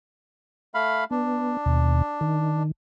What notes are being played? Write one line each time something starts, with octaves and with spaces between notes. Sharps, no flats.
A3 F5 B5
B3 D4
D#2 B2
D#3